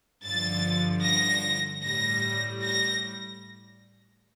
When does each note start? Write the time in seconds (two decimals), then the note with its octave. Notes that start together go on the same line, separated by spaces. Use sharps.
0.24 G2 D3 F3 A6
1.04 A#6
1.84 A2 G3 A#6
2.63 A#6